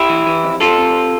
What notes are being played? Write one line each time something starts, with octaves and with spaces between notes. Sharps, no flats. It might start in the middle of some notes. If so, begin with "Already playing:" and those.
Already playing: E4 G4
E3
E3
F2
C3 F4 A4
C3